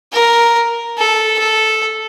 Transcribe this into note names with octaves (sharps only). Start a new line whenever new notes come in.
A#4
A4
A4